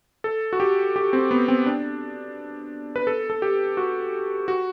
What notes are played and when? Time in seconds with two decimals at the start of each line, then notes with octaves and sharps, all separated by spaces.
0.24 A4
0.53 F#4
0.60 G4
0.96 G4
1.13 C4
1.31 B3
1.48 C4
1.66 D4
2.96 B4
3.07 A4
3.30 A4
3.42 G4
3.77 F#4
4.48 F#4